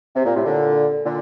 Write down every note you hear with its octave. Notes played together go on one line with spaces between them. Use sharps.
C3
A#2
A2 C3
A#2 D3
A#2 D3